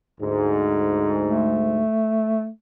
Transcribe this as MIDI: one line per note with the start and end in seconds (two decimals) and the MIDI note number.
0.21 1.82 38
0.21 1.82 44
1.23 2.49 57